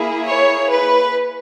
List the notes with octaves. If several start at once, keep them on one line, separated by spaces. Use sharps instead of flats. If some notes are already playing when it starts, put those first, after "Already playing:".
Already playing: A#3 E4 G#4
C#5
B4